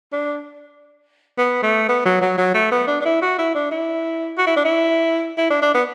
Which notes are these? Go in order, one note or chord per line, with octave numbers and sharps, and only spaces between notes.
D4
B3
A3
B3
F#3
F#3
F#3
A3
B3
D4
D4
E4
F#4
E4
D4
E4
F#4
E4
D4
E4
E4
D4
D4
B3